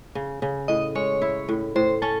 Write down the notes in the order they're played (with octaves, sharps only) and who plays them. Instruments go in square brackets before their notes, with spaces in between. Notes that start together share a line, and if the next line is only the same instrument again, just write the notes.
[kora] C#3
C#3
[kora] A2 [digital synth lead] D#5
[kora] G#3 [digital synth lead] C#5
[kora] E4
A2
[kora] A2 [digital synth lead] C5
[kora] C#4 [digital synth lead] A4